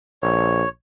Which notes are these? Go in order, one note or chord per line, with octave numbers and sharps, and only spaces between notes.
A#1 C#5